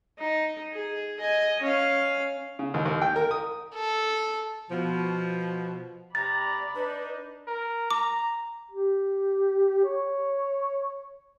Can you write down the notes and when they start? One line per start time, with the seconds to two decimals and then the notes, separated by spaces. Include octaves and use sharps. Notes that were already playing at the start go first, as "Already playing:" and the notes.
0.19 D#4
0.72 G#4
1.20 D#5 G#5
1.61 C#4 F5
2.59 C#3
2.74 D#2
2.85 D#2
3.02 G5
3.16 A#4
3.31 D#6
3.75 A4
4.70 B2 F3
6.15 C3 D5 A#5 B5 A6
6.75 D4 D#4 B4
7.48 A#4
7.91 A#5 D6
8.71 G4
9.85 C#5